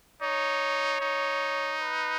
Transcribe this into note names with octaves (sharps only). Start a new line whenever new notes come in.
D#4 C#5
D#4
B4